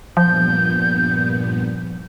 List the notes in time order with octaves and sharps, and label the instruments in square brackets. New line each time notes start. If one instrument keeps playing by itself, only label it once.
[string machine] G2 A#2 B3 [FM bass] F3 [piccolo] G6